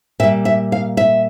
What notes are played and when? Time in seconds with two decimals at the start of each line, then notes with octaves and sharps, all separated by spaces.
0.20 A#2 E5
0.23 G3
0.45 E5
0.72 F5
0.97 E5